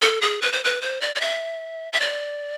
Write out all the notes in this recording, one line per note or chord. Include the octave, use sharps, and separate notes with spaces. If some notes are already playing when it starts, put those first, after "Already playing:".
A4
G#4
B4
C5
B4
C5
D5
D5
E5
E5
D5